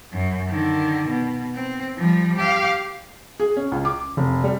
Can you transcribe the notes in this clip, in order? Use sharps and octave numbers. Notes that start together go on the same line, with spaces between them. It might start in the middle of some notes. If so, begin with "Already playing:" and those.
F#2
D3 D#3
B2
C4
F3 G3
G4 F5
G#4
C#4
C#2
D6
F1
G3